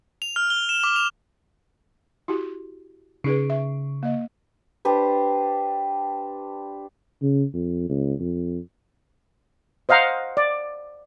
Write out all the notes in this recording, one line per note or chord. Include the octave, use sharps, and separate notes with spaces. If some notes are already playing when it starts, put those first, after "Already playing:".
F7
F6
G7
E7
D6
F7
E4 F#4 G4
C#3 D#4 G#4 B4
E5
A#3 D#5
D4 G4 B4 C5
C#3
F2
C#2
F2
C5 D#5 F5 F#5 A#5
D5